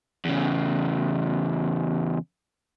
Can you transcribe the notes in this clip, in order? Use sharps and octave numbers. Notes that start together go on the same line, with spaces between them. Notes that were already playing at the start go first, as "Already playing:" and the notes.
E2 C#3